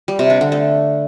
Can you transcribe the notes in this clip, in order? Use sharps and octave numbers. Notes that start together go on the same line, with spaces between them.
G3
C3
D4
D3
A3